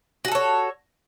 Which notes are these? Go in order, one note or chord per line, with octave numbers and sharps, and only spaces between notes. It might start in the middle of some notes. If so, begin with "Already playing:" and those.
F#4 G#4 A4 C#5